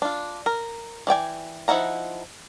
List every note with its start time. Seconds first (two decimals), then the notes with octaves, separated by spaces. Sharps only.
0.02 D4 F4
0.46 A#4
1.07 E3 D5 G5 G#5
1.68 F3 D#4 E4 F#5 A#5